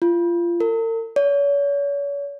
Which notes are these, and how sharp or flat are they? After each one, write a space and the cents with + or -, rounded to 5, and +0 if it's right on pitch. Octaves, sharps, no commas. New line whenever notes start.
F4 -25
A#4 -45
C#5 +40